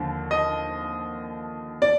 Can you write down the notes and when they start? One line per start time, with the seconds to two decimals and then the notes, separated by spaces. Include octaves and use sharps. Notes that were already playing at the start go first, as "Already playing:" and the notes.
Already playing: D#2 D3 F3
0.31 D#5
1.82 D5